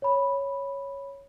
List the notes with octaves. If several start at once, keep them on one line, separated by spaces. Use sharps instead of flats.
C#5 B5